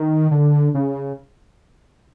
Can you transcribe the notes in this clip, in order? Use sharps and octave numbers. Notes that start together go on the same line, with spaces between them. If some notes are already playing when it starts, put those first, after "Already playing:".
Already playing: D#3
D3
C#3